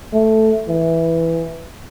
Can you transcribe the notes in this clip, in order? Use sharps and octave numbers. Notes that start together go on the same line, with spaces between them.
A3
E3